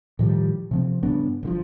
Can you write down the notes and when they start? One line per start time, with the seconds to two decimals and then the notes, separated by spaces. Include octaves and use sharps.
0.19 A2 D#3 F3 G3
0.71 C3 F3 C4
1.03 G2 C#3 B3 D4
1.43 G1 D3 F3